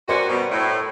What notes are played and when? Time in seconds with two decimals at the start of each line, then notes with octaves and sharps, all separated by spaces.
0.09 C4 C#4 F#4 A#4 C5 D5
0.29 B2 G3
0.50 A2